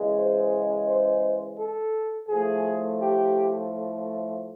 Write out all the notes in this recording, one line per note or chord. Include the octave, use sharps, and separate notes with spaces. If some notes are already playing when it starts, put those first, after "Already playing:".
Already playing: C#3 E3 G#3
C5
C5
A4
A2 F3 A3 G#4
G4